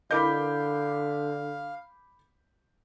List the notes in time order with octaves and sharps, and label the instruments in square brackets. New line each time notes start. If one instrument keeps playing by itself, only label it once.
[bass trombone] D3 [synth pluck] E4 A#4 D#5 [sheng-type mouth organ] F5 [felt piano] B5 D6 G6